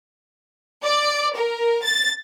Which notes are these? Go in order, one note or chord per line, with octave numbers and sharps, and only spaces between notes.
D5
A#4
A6